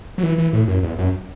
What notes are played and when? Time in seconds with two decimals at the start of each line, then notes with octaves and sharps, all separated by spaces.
0.18 F#3
0.23 E3
0.38 E3
0.53 A2
0.68 F#2
0.83 E2
0.98 F#2